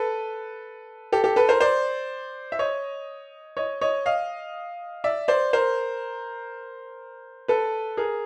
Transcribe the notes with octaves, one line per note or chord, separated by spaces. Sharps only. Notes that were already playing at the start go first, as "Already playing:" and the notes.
Already playing: A4 B4
G4 A4
G4 A4
A4 B4
A#4 C5
C5 D5
E5
C#5 D#5
C#5 D#5
C#5 D#5
D#5 F5
D5 E5
C5 D5
A#4 C5
A4 B4
G#4 A#4